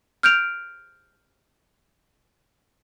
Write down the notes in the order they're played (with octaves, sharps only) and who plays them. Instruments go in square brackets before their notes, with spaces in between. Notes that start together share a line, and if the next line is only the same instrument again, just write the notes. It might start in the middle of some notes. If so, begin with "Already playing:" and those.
[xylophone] F6 G6 D7 F7